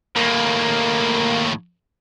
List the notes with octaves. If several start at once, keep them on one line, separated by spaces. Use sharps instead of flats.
D#2 A2 A#3